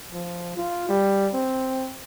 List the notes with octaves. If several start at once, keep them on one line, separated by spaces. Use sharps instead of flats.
F3
F4
G3
C4